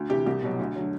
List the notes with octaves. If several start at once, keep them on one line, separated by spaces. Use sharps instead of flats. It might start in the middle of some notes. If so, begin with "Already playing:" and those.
Already playing: D2
C3 E3 G4
C2 G4
B2 F#3
D2
D3 F#3